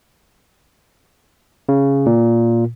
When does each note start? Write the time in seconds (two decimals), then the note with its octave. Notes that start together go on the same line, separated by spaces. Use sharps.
1.69 C#3
2.06 A#2